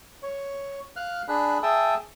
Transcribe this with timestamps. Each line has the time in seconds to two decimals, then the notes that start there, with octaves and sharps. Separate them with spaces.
0.23 C#5
0.96 F5 F6 F#6
1.28 D4 G#4 B5 F#6
1.63 G#4 E5 G5 A5 D#6